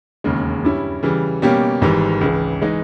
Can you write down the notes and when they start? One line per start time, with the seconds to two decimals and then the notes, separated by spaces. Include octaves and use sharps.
0.24 E1 D#2 C#3 G#3
0.63 G2 G3 C#4 E4
1.03 C#3 E3 G3
1.42 B2 G3 A#3 C#4 G4
1.81 G#1 G#2 E3 G3
2.21 C#2 C#3 E3
2.61 E3 G#3 D#4